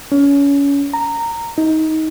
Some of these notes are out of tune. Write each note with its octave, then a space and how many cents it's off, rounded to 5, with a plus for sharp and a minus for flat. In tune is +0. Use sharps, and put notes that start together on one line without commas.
C#4 +25
A#5 -15
D#4 +20